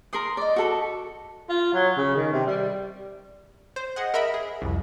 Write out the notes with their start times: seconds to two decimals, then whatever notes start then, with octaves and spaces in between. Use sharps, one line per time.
0.13 A#4 B5 C6 D#6
0.37 D5 D#5
0.56 F#4 A4 B5
1.49 F4
1.73 F#3
1.97 C#3
2.15 D#3
2.32 C3
2.46 G3
3.76 C5
3.96 G#4 D#5 F#5
4.14 A#4 D#5 E5 B5
4.34 G#4
4.62 C2 F2